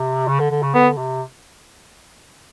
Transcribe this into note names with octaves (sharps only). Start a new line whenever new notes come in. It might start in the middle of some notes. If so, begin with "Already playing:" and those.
Already playing: C3
C#3
D3
D3
C#3
D3 B3
C3